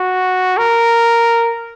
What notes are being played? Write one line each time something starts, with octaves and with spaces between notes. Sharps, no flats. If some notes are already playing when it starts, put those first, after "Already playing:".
Already playing: F#4
A#4